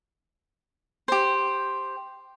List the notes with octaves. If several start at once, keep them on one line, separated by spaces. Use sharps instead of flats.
G4 C5